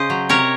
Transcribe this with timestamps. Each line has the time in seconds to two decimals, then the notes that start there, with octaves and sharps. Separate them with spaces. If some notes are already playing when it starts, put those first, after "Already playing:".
Already playing: C#3 C5 D#5
0.10 F#3
0.29 C3 A#4 C#5